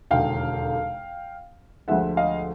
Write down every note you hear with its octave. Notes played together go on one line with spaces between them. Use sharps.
E1 D#2 D3 F5 G5
D2 D3 F3 G#3 E5 F#5
D#5 F5